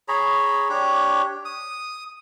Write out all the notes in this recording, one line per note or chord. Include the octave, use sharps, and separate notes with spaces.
G#4 C#5 A#5 B5
D4 G4 C#5
D#6